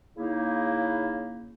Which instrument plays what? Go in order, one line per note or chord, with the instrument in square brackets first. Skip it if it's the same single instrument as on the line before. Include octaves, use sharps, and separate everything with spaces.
[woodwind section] C#3 A#3 D#4 E4